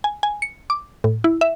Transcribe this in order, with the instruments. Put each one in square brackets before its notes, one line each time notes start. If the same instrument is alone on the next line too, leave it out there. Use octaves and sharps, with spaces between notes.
[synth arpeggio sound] G#5
G#5
C#7
D6
A2
E4
E5